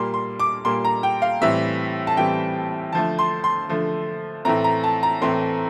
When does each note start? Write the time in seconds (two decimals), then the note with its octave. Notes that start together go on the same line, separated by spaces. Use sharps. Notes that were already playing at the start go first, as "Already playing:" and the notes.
Already playing: A#2 G3 A#3 C6
0.14 C6
0.40 D6
0.65 A#2 G3 A#3 C6
0.85 A#5
1.03 G5
1.22 F5
1.41 A2 E3 G3 C4 E5
2.07 A5
2.17 A2 E3 G3 C4 G5
2.93 D3 F3 A3 A5
3.19 C6
3.44 C6
3.69 D3 F3 A3
4.45 A2 E3 A3 C4 A#5
4.64 A#5
4.84 A5
5.03 A#5
5.22 A2 E3 A3 C4 C6